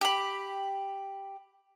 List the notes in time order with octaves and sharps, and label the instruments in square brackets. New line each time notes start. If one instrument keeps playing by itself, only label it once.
[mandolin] G4 B5